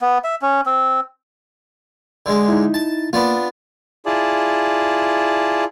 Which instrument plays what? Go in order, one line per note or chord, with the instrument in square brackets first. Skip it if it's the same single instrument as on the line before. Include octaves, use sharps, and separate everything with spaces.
[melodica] B3
E5
C#4
C4
[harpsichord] D3 G#3
[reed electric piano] D#4 E4
[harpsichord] A5
[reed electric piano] A#3 [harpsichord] B3 D4 F4
[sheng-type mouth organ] E4 F4 G#4 D5 A5